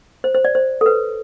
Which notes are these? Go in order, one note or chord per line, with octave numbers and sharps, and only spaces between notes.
C5
C5
D5
C5
A4
B4